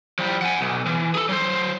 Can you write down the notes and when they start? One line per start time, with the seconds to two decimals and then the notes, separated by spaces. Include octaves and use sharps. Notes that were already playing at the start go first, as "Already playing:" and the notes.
0.19 F3 G3
0.42 F#5 G#5
0.61 B1
0.87 E3
1.15 G#4 A4
1.29 F#3 C5